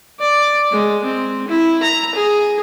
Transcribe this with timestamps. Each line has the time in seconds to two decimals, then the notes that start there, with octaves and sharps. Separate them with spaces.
0.20 D5
0.72 G#3
1.04 C4
1.48 E4
1.83 A#5
2.15 G#4